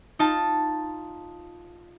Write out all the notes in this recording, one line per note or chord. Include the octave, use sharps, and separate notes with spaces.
D#4 F4 A5